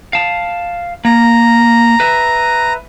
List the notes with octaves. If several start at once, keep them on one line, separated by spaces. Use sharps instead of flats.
F5 A5
A#3 A#5
B4 E5